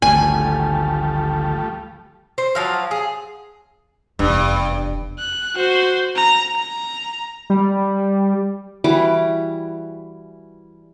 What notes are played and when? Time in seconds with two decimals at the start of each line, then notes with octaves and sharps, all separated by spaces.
0.02 G#1 D2 F3 G3 A3 G#5
2.38 C5
2.55 F3 F#3 F5
2.91 G#4
4.19 F1 E2 G2
5.18 F#6
5.56 F#4 C5
6.16 A#5
6.54 A#5
7.50 G3
8.84 E3 G3 F#4 D6